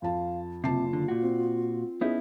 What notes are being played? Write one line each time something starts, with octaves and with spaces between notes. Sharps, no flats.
F2 F4 F5 A5
F#1 C3 F4 A5 C7
D3
A#2 F#4
C4
B3 C#4 D#4 E4 G#4